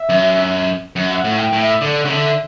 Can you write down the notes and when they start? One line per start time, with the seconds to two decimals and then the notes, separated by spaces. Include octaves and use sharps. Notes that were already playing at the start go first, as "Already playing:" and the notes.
Already playing: E5
0.09 F#2
0.96 F#2 F#5
1.12 E5
1.18 F#5
1.24 A2
1.39 G5
1.53 A2
1.60 E5
1.81 D3 D5
2.01 F#5
2.05 C#3
2.10 D3 E5